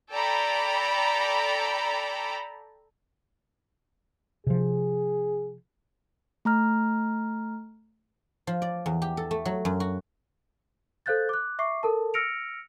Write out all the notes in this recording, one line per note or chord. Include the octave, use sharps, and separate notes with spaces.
A4 D5 G5 A#5 B5
C3 F3 G#4
A3 A#5 F6
F3
D5
E2
G4
A4
A3
F#3
F#2
F#4
A4 C5 F5 F#6 G6 A6
D6 F#6
E5 C#6 D6 C7
A4 A#4 A5
E6 F6 A#6 C#7 D7 F7